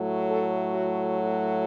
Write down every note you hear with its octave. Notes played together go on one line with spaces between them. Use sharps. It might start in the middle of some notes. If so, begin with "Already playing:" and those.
Already playing: A2 F#3 A3
A4
F#4
F#4